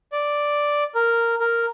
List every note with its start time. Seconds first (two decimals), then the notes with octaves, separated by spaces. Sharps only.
0.12 D5
0.95 A#4
1.40 A#4